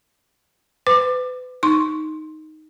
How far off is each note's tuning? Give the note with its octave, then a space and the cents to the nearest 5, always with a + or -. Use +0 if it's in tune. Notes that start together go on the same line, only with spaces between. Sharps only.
B4 +35 D6 +25
D#4 +0 C6 +15